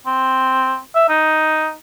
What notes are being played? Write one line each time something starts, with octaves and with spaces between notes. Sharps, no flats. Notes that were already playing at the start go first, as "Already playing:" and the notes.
C4
E5
D#4